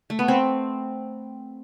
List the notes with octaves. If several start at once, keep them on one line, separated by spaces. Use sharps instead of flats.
A3
B3
C4